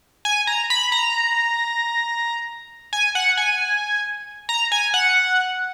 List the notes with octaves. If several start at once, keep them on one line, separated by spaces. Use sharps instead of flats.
G#5
A#5
B5
A#5
G#5
F#5
G#5
A#5
G#5
F#5